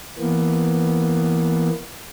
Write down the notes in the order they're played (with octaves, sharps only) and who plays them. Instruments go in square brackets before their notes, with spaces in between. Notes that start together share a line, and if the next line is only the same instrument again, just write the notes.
[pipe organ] E3 A#3 B3